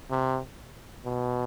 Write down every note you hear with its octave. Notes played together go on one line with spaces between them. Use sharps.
C3
B2